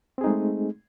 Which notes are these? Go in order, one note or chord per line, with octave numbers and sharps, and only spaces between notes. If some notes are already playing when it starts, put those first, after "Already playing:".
G#3 A3 C4 D#4 G#4